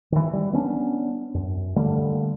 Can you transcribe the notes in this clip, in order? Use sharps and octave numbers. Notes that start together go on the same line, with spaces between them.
D#3 E3
G3
B3 C#4 D4
F#2
D3 G3 A3 A#3